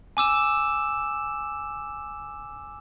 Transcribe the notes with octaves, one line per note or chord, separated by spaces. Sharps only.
G#5 D6 E6 E7